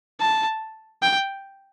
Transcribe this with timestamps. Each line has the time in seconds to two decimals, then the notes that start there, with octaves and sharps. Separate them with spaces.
0.21 A5
1.03 G5